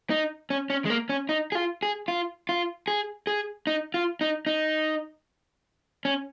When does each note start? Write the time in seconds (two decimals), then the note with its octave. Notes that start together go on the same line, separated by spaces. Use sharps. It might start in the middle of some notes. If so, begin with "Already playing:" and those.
0.10 D#4
0.50 C#4
0.70 C#4
0.85 G#3
0.90 A#3
1.09 C#4
1.29 D#4
1.52 G#4
1.55 F4
1.83 G#4
2.08 F4
2.49 F4
2.88 G#4
3.27 G#4
3.67 D#4
3.94 F4
4.21 D#4
4.47 D#4
6.05 C#4